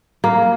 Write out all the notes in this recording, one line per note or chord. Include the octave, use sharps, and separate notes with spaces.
A#3